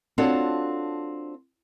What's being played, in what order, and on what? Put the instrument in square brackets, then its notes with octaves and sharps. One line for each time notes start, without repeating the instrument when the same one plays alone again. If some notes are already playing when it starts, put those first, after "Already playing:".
[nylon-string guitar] C4 D4 F4 F#4 A4 C#5